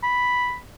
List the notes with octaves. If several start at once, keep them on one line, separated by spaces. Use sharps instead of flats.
B5